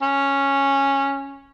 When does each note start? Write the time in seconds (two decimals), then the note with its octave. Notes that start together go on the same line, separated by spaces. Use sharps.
0.02 C#4